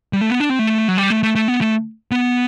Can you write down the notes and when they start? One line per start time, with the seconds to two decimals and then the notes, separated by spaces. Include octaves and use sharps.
0.13 G3
0.21 A3
0.30 B3
0.40 D4
0.49 C4
0.59 A3
0.88 F#3
0.97 G3
1.10 A3
1.23 A3
1.35 A3
1.48 B3
1.61 A3
2.11 B3